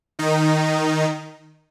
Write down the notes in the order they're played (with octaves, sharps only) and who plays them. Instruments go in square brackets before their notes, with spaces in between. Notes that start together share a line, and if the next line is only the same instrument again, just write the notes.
[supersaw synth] D#3 D#4